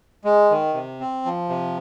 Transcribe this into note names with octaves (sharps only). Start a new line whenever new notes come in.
G#3
D#3
C3
C4
F3
C3